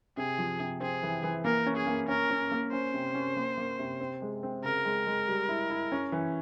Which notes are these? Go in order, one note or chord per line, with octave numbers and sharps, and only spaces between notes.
C3 G#4
F3
C3
C4 G#4
E3
E3
A#3 A#4
C#4
G#4
A#3
C#4 A#4
C#4
A#3
C#4 C5
C3
C#4
A#3
A#3
C3
C4
G#3
C4
C#3 A#4
G#3
G#3
G3
E4
E4
C#4
E3